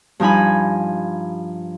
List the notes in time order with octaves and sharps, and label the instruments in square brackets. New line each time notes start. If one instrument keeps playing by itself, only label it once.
[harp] G2 F3 D#4 G#5 B5